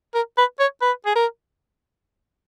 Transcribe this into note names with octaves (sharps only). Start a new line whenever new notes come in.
A#4
B4
C#5
B4
G#4
A#4